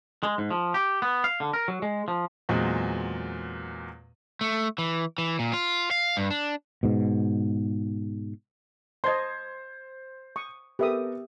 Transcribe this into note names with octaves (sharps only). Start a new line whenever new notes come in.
G#3
G#2
F3
G4
B3
F5
D3
A#4
F#3
G#3
F3
E2 A#2 F#3 G#3 C4
A3
E3
E3
A#2
F4
F5
G2
D4
G#2 B2
C5 D#5 A5 C6 G#6
C#6 D#6
B3 G4 A4 A#4 E5 D#6